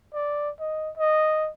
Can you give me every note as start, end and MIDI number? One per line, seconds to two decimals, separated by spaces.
0.14 0.50 74
0.60 0.91 75
0.97 1.49 75